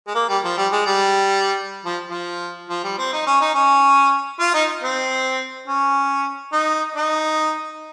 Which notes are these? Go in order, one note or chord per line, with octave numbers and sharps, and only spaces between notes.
G#3
A#3
G3
F3
G3
G#3
G3
F3
F3
F3
G3
C4
D#4
C#4
D#4
C#4
F4
D#4
C4
C#4
D#4
D#4